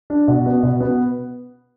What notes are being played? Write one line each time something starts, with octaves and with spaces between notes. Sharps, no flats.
D4
B2
B3
B2
B3